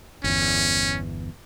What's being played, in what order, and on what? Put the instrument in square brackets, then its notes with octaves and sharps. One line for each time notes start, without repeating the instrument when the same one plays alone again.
[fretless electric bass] G1 E2 [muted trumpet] C#4